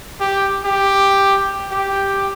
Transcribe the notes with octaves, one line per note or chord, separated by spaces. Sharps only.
G4
G4
G4